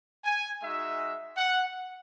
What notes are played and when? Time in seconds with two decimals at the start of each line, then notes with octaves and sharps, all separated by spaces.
0.24 G#5
0.62 G#3 D#4 F#4 E5
1.37 F#5